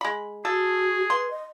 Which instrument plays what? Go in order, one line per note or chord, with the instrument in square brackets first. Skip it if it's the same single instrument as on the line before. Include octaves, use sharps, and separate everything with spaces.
[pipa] G#3 B5
[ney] F#4 [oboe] G#4 [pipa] A4
[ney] B4 [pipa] C6
[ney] D#5